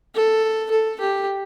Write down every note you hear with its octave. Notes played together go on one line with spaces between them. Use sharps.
A4
A4
G4